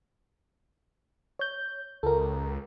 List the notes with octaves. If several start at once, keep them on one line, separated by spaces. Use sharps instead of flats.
C#5 G6
C#2 A4 A#4